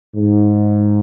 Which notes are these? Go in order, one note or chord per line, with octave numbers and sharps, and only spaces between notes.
G#2